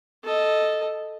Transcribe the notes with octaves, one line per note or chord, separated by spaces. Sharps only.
A4 D#5